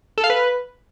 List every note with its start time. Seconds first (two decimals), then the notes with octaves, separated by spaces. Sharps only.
0.18 A4
0.24 F5
0.30 B4